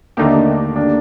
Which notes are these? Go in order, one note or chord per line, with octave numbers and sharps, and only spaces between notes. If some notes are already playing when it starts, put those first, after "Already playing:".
D#2 D3 A3 A#3 D4 D#4 G4
A#3 D4